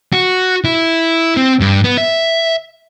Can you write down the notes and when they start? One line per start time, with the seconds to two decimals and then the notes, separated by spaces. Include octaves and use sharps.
0.13 F#4
0.64 E4
1.37 C4
1.60 G2
1.84 B3
1.98 E5